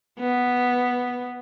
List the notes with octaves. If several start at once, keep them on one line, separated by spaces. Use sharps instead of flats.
B3